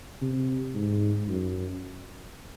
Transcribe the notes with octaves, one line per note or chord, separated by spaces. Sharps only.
C3
G#2
F#2